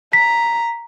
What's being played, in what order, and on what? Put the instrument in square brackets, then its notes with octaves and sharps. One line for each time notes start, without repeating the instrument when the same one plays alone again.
[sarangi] A#5 [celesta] B6